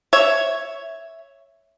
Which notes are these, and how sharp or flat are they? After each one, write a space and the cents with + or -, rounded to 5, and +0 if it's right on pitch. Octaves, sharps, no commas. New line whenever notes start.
C#5 +0 E5 +0